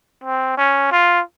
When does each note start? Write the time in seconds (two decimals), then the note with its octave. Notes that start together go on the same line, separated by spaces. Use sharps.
0.24 C4
0.57 C#4
0.91 F4